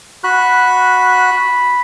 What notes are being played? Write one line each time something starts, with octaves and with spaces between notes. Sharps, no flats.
F#4 B5 F#6